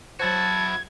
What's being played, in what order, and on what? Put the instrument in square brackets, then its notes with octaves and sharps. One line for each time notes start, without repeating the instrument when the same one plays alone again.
[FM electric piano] F#3 C5 [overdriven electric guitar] E4 F#4 [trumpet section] A5 [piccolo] G#6